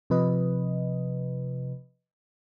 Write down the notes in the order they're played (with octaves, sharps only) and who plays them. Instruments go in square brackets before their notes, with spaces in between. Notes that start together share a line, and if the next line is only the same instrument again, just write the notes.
[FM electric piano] C3 F3 B4 D#5